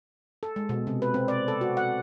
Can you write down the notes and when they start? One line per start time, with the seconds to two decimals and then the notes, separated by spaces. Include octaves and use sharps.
0.43 A4
0.56 G#3
0.69 B2
0.87 C3
1.02 B4
1.14 C4
1.28 D5
1.48 A4
1.61 F#4
1.77 F#5